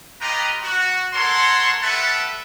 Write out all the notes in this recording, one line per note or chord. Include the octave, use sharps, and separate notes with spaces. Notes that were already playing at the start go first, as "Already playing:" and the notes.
F4 G4 B4 D#5 G5 A#5
F#4
A4 A#4 C#5 F#5 C6
G3 A4 B4 E5 F#5 A5